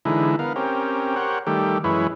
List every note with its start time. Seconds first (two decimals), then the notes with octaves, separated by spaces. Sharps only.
0.05 D3 E3 G#3 D#4 E4
0.39 B3 A#4 F5
0.56 C4 C#4 G4 A#4
1.16 G4 A#4 C5 C#5 F#5
1.47 D#3 G3 A3 G4
1.84 F#2 E3 G#3 E4 B4 C#5